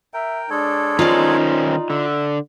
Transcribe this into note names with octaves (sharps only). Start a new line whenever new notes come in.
A#4 E5 G5
G#3 D4 A4 C#5
D#3 C#4 D#4 F4 C5 D5
D3 E5